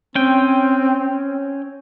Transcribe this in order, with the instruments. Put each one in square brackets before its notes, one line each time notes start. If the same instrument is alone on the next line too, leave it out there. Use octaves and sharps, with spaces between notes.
[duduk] C4 [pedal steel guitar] C#4 G5